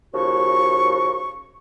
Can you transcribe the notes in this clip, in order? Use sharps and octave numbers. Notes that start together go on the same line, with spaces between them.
D#2 C#3 F3 F#4 C#6